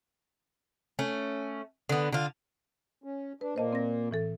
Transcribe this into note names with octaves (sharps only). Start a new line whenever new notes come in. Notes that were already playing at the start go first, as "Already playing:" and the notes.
A3 C#4
D3 B3
D3 F4
C#4
D4 B4
A#2 A#3 C5 D#5 A5
C4 A#6
A2 E3 A4